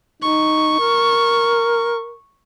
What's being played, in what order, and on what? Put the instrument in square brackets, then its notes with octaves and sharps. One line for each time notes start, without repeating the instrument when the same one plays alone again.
[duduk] D#4 [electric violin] C#6
[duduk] A#4